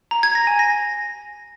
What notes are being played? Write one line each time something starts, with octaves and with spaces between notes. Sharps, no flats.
A#5
G#6
A#6
G#5
A#6